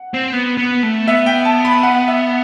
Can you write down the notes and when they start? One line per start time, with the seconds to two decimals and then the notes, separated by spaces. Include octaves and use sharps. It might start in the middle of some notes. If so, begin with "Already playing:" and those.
Already playing: F#5
0.14 C4
0.33 B3
0.57 B3
0.83 A3
1.08 B3 E5
1.26 G5
1.45 A5
1.65 B5
1.83 F#5
2.08 E5